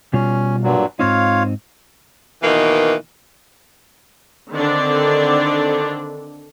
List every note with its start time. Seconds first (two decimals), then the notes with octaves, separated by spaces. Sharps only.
0.13 B2 G3 C#4 F4
0.64 G2 A#2 F#3
0.99 G#2 C4 D#4 F4 C#5 F5
2.42 B2 D#3 E3 A#3
4.52 D3 D#3 C4 D4 A4 D5